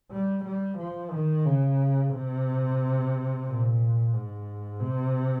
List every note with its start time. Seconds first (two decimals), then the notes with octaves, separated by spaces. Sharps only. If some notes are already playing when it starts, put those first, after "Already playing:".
0.11 G3
0.44 G3
0.78 F3
1.11 D#3
1.46 C#3
2.13 C3
3.46 A#2
4.13 G#2
4.80 C3